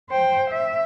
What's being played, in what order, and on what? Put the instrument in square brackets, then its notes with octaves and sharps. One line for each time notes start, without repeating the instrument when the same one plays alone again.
[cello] C5 G5
E5